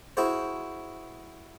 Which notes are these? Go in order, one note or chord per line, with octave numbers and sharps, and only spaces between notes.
E4 F#4 G#4 C5